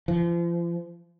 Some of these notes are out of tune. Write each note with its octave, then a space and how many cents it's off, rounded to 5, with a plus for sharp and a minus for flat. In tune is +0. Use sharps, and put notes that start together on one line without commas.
F3 -35